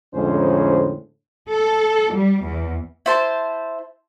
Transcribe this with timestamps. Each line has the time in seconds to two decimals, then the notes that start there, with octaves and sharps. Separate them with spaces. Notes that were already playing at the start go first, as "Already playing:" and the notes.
0.14 F2 A2 D3 G#3 C#4 C5
1.49 A4
2.14 G3
2.43 E2
3.06 E4 C5 A5